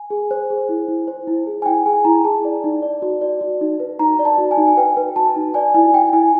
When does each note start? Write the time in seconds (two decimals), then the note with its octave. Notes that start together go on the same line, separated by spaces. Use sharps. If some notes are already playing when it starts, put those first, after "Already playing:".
Already playing: G#5
0.10 G#4
0.31 C5
0.50 G#4
0.69 E4
0.88 E4
1.08 C5
1.27 E4
1.47 G#4
1.62 G#5
1.66 E4 G5
1.86 G#4 G#5
2.05 E4 A#5
2.25 G#4 A5
2.45 D5
2.64 D#4
2.82 D5
3.02 F#4
3.22 D5
3.41 F#4
3.61 D#4
3.80 B4
3.99 D#4 A#5
4.19 D5
4.25 A5
4.38 F#4
4.51 G#5
4.57 D#4
4.67 G#5
4.77 B4 G5
4.97 B4
5.16 F#4 A5
5.36 D#4
5.54 D5 G#5
5.74 E4 G#5
5.94 E4 G5
6.13 E4 G#5